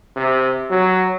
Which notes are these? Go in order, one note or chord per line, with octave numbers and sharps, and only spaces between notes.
C3
F#3